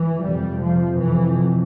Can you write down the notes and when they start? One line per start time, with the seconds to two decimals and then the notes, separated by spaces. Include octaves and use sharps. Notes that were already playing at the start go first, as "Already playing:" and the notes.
Already playing: E3
0.21 F2 C3 G3
0.60 F3
0.99 F2 C3 E3